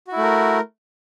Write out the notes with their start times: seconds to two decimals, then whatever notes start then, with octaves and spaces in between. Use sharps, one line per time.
0.07 F#4
0.12 E4
0.17 A3
0.22 A#4